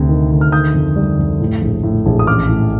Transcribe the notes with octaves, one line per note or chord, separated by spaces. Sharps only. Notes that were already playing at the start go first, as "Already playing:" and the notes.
Already playing: D2 C3
D#3
D2
F6
D#3 D#6 G6
F2
G3
F2
A2
A#1
A2
A#1
D#6
A1 D6 F6
A2